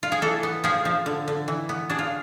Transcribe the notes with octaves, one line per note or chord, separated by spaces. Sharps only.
F4
G#4
E3 A4
B3
F3 G#4
F3
D3
D3
E3
B3
D4 G#4
F4